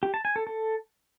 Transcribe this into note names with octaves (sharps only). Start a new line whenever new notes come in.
G4
A5
G#5
A4
A4